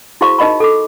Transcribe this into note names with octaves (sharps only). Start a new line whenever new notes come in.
E4 F#4 G#4 C5 F5 C#6
D#4 A#4 D#5 F5 B5
A4 D6